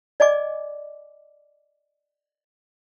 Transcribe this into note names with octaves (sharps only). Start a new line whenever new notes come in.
D5 D#5 G#5 D6